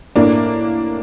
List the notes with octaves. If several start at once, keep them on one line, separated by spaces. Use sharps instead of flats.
A2 A#3 D4